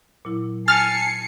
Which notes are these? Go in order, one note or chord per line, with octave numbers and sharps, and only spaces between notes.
A#2 F#3 E4
G#5 A5 F6 A6 C7 C#7